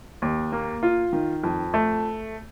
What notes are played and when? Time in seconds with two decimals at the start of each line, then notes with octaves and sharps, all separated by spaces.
0.22 D#2
0.52 A#3
0.83 F4
1.13 D#3
1.44 F2
1.74 A3